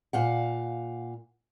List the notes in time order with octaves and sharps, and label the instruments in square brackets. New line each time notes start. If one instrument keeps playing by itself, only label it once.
[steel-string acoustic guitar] A#2 F5 F#5